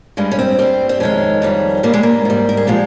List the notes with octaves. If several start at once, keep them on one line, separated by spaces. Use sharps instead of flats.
G2 G3 G#3
C#4
C4
G2 G3 C4
C4
F2 D#3 G#3 C#4
F2 D#3 G3
G2 G3 A#3
G#3
A#3
G#2 G3
A#4
G#4
A#2 F3 G#3 G4